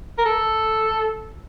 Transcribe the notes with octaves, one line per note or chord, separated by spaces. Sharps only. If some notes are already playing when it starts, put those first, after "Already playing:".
A#4
A4